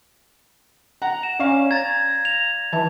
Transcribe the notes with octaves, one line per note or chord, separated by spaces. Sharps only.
F#5 A#5
E7
C#4 D5 F5
A#5 G#6 A6
F7
E3 A5